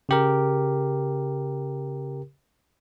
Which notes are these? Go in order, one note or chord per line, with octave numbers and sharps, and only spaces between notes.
C#3 G4 A#4